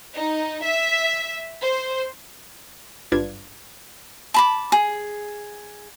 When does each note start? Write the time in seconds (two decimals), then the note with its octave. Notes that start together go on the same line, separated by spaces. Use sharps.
0.16 D#4
0.65 E5
1.63 C5
3.12 G#1 G2 D4 F4 B4 G#6
4.34 A5 B5 D6
4.72 G#4